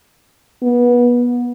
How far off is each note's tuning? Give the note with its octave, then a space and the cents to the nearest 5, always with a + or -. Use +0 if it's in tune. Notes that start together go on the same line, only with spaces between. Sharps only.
B3 -25